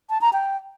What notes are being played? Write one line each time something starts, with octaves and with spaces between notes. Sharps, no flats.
A5
A#5
G5